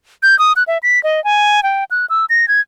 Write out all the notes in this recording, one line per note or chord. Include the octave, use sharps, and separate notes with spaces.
G6
D#6
F#6
E5
B6
D#5
G#5
G5
F#6
E6
A#6
G#6